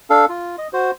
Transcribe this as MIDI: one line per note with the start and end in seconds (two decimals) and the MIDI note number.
0.10 0.25 62
0.10 0.25 69
0.10 0.25 77
0.29 0.56 65
0.58 0.68 75
0.73 0.91 66
0.73 0.91 72